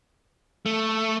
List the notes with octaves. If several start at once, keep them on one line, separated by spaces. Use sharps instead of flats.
A3